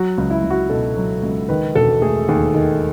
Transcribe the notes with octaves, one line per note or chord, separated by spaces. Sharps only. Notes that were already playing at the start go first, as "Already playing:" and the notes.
Already playing: F#3 F#4
C#2
E4
C#2
F#4
B2 A4
F#3
C#2
D#3 B4
E1 A4
A3 G#4
D#2 G#4
D#3